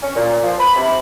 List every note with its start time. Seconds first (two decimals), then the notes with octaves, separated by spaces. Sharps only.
0.02 C#4
0.15 A#2
0.43 F3
0.60 B5
0.76 C3